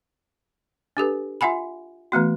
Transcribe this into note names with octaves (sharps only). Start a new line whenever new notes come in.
D4 G4 A4 B4
F4 E5 F#5 G#5 B5
E3 A3 B3 F#4